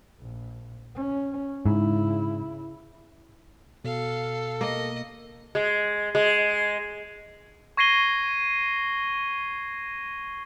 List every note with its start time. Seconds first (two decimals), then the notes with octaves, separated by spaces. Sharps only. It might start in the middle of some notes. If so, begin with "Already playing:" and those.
0.20 A#1
0.95 C#4
1.66 G#2 C#3 E4
3.84 B2 A4 F5
4.61 A#3 D#5
5.55 G#3
6.15 G#3
7.77 C#6 G#6 A#6 C7 D#7 G7